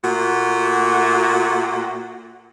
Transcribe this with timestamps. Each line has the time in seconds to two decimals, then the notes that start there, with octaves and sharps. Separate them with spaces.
0.04 A#2 A3 F#4